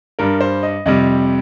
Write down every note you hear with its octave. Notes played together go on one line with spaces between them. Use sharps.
G2 G3 A#4
C5
D#5
F2 C3 G3 D#5